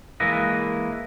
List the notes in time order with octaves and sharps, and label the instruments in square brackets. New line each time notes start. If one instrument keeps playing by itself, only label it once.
[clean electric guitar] E3 G#3 A#3 E4 B4 D#5